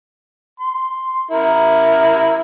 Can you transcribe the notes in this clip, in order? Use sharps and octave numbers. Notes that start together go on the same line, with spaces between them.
C6
E4 A#4